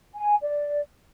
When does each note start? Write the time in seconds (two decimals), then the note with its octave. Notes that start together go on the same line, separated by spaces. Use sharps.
0.16 G#5
0.43 D5